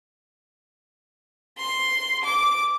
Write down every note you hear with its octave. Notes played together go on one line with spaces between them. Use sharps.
C6
D6